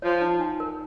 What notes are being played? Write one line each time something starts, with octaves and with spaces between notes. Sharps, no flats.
F3 C#5
D#4
G#5
A#4